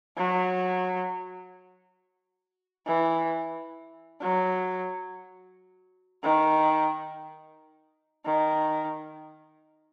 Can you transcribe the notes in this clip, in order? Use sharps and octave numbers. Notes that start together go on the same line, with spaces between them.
F#3
E3
F#3
D#3
D#3